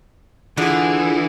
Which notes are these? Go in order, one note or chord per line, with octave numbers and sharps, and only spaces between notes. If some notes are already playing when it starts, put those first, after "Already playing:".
D3 E3 F4 G#4